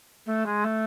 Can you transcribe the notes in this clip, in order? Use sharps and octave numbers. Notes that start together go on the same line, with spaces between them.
A3
G#3
A3